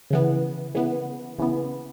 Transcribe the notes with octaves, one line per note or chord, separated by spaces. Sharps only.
C#3 E3 B3
C#3 E3 B3
C#3 E3 B3